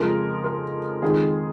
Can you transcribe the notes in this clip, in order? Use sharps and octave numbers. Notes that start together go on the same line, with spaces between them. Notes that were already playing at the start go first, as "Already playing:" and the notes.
Already playing: F2 C#3 F3 G#3 A#4
A#4
F2 D#3 G#3 G#4